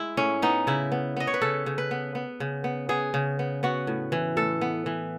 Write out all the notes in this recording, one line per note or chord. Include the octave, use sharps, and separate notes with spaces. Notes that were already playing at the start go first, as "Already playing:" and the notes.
Already playing: G#3 E4
A2 C#4
B3 D#4
C#3 E4
B3
B3 D#5
C#5
B4
C#3 A4
C#3
B4
B3
B3
C#3
B3
B3 G#4
C#3
B3
B3 F#4
A2
E3
A2 A4
B3
E3